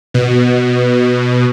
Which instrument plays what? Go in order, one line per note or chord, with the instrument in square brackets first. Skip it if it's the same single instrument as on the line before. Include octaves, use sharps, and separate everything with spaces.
[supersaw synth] B2